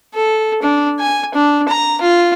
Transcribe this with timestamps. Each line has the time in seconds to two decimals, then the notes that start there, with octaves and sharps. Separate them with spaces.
0.14 A4
0.62 D4
1.00 G#5
1.34 D4
1.68 A#5
2.01 F4